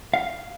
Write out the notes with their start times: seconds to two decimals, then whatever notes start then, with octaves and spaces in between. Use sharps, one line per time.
0.14 F5